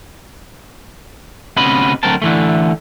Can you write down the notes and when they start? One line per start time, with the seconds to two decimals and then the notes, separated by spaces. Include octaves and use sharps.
1.57 D2 C3 B3 C#4 D#5 B5
2.03 D2 F#3 C4 A#4 A5
2.22 D3 E3 A3